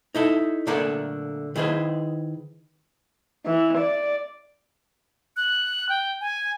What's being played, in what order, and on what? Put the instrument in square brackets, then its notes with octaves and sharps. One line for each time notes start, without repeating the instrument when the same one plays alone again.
[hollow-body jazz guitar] D#4 E4 A4
A#2 D3 A3 A4 A#4 D5
D#3 E4 G#4 B4 C5
[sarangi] E3
D5
[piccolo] F#6
G5
G#5